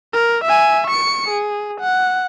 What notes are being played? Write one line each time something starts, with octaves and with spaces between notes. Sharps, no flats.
A#4
E5 G#5
C#6 C#7
G#4
F#5